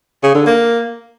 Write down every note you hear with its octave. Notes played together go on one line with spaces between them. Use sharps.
C#3
D3
A#3